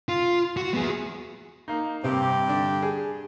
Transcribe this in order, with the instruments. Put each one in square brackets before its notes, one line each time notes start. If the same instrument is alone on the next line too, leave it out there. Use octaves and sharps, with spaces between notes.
[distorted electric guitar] F4
F#4
B3 G#4
[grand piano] A#3 D#4
[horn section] G2 G4 [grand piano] C3 C4
[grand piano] D3 D4
G#4